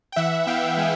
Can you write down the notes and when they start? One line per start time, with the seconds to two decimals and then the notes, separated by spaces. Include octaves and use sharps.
0.12 G5
0.16 E3 E5 F#5
0.47 B3 F5 G5
0.77 G#3 F#5 G#5